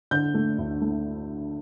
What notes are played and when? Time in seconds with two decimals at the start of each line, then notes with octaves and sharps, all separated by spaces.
0.11 D3 G6
0.34 A3
0.58 D2
0.81 A3